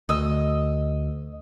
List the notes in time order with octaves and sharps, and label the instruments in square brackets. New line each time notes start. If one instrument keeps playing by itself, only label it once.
[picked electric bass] D2 [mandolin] D#5 E6